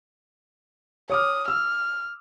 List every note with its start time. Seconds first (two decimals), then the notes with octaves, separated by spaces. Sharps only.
1.10 C#5 D6 D#6 F6
1.48 E6 F6